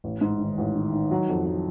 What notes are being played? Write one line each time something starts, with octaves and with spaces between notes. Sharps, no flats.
A1
G#2
D#3
A1
D#3
D#3
F#3
F2
F#3